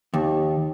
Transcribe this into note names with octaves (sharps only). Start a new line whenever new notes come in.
D#2